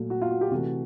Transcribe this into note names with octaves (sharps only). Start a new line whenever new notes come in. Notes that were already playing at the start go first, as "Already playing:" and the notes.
Already playing: A#2 F#3 A3
F#4
F4
F#4
G4
C3 E3 A3 F#4